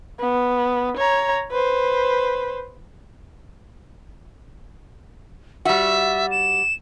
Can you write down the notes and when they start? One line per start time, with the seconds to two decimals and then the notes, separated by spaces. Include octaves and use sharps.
0.20 B3
0.97 C#5 A#5
1.51 B4 C5
5.65 G3 F#4 E5
6.31 E7